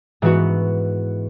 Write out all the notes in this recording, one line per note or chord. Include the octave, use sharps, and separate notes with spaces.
G#2 E3 B3 F#4